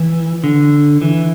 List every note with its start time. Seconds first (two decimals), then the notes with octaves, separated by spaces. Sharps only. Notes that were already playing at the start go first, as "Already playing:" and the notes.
Already playing: E3
0.44 D3
1.02 E3